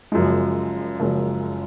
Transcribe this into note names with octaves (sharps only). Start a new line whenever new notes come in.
F#1 F#2 F3 G#3
F#1 F#2 F3 G#3